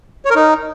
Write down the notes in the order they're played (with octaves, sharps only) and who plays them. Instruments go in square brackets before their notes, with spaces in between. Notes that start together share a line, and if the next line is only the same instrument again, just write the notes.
[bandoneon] C#5
A#4
D#4